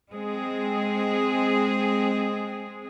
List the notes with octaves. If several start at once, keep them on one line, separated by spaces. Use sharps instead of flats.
G#3 C4 G#4